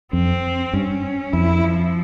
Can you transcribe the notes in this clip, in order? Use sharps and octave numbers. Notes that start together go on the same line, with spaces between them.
F2 C4
G2 C#4
F2 E4
F3